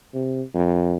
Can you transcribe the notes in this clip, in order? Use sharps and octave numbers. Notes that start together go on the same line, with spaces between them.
C3
F2